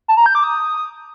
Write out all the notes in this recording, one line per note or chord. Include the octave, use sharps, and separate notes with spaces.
A5
A#5
G6
D6
D#6